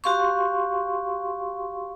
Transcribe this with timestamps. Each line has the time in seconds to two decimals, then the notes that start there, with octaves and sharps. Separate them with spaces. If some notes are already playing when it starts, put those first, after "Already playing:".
0.04 F#4 G4 F5 C6 C#6